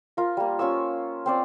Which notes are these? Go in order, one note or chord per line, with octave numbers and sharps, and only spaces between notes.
F4 A#4
G3 A#3
C#4 F4 C#6 E6
C4 C5 D5